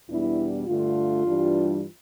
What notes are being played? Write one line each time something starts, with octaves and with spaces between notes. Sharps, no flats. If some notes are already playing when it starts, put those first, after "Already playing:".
E2 B2 G3 B3 D4 E4
G2 D3 A3 D4 F4
G2 E3 G3 D4